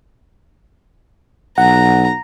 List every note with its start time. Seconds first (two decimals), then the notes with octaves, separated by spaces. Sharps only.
1.58 B1 F#5 A#5